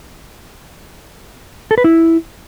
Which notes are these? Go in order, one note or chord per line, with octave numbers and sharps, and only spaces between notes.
A4
B4
E4